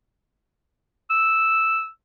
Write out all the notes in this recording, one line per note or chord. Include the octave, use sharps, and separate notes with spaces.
E6